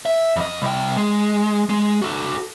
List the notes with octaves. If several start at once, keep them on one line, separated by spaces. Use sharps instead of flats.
E5
F2 D#5
C2 G5
G#3
G#3
F#4 A4